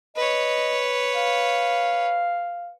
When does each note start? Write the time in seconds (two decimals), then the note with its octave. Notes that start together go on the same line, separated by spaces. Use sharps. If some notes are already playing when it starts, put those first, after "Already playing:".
0.16 B4 C#5 D#5
1.15 F5